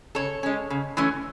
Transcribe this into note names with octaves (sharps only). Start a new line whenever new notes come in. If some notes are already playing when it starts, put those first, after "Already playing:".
C#3 A4 C#5
G#3 C#4
C#3
E3 A3 C#4